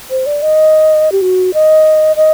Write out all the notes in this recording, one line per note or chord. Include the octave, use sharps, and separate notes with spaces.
C5
D5
D#5
G4
F#4
D#5
D#5